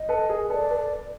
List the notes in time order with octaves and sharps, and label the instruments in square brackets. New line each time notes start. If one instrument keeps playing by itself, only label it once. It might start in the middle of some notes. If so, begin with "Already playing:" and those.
Already playing: [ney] D#5
[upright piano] A4 B4
G#4 A#4
[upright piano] A4 B4 [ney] D5
[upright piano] A4 B4